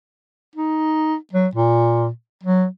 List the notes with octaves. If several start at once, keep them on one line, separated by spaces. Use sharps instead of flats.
D#4
F#3
A#2
F#3